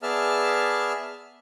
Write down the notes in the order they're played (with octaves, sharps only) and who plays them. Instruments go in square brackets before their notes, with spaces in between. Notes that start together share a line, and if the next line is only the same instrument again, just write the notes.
[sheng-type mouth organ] B3 G#4 D5 E5 A5 F6